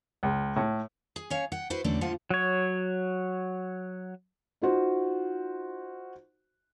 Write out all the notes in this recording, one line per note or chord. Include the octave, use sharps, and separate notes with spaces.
C#2
A2
G#4
C#4 C#5 F5
F#5 G5
E4 F#4 B4 C5
E2 D3 F#3 A3 C#4 D5
F2 A2 D3 F3 F4 F#5
F#3 C#5
D#4 F4 F#4 C5